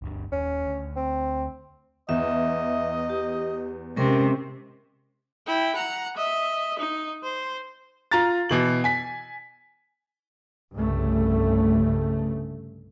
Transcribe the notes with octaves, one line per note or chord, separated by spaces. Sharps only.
G1 D2 G2
D#1 C#4
D2
C4
E2 D#5 E5
G4
C3 G#3 C#4 A#4
E4 G5
F#5 A#5
D#5 E5
D#4
C5
F4 A#5 A6
B2 E3 F#7
G#5 B6
C2 G2 C#3 A3